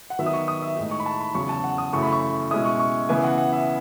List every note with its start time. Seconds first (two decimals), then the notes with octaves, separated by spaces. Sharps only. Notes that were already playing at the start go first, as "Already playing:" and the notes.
0.10 F#5
0.19 D#3 F#3 B3 E5
0.26 D#6
0.33 C#6
0.48 D#6
0.62 E5
0.76 A2 G#3 D#4
0.91 C#6
1.00 B5
1.06 A5
1.20 B5
1.35 E2 C#3 F#3 C#6
1.49 A5
1.64 F#5
1.78 D#6
1.93 F#2 C#3 E3 A3 C#6
2.02 B5
2.12 C#6
2.51 B2 G#3 C#4 E4 D#6
2.65 C#6
2.79 C#6
3.09 C#3 E3 B3 E4 G#5
3.24 F#5
3.38 F#5
3.52 E5